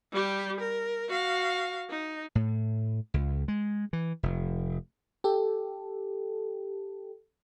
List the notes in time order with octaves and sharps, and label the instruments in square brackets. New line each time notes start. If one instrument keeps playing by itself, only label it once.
[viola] G3 G4
A#4
F#4 F5
D#4
[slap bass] A2
C#2
G#3
E3
F1
[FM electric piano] G4 A4